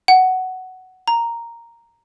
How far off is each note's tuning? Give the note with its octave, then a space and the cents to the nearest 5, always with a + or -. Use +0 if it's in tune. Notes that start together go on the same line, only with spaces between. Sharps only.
F#5 +10
A#5 -5